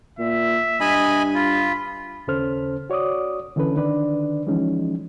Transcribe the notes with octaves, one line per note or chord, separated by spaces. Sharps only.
A#2 E5
G2 D#5 G#5 B5
F4 B5
D#2 C#3 C#4 A4 C5 F6
F#4 C#5 D5 D6 D#6
D3 E3 C#4 A4 B4
D3 D#3 D4 B4 D5
E3 F3 G#3 C#4 D#4